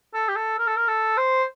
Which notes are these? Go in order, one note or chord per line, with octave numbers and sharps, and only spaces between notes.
A4
G4
A4
A#4
A4
A#4
A4
C5